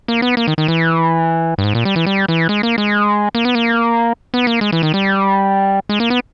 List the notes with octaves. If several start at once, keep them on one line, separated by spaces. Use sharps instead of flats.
A#3
B3
A#3
D#3
D#3
E3
G2
G#2
A#2
G3
E3
G3
E3
G#3
A#3
G#3
A#3
B3
A#3
B3
A#3
G#3
E3
D#3
G3
G#3
A#3
B3